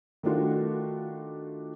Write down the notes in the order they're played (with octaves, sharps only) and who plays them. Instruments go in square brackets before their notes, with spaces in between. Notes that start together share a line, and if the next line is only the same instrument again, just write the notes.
[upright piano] D#3 A3 D4 F4 F#4